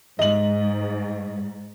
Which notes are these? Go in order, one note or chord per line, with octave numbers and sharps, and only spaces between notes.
G#2 D#5 F#7